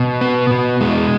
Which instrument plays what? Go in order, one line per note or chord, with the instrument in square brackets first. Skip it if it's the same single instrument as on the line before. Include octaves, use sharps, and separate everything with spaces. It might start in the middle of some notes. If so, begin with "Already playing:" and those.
Already playing: [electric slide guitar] B2
B3
B2
G#3